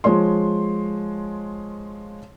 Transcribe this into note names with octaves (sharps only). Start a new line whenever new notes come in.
F3 G#3 C#5 C6